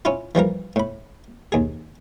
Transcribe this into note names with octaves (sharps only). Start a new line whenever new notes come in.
C#4 E4 F4
E3 F3 G3 A#4
A2 B5
D#2 G#4